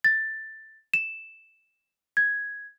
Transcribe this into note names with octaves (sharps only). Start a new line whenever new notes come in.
A6
E7
G#6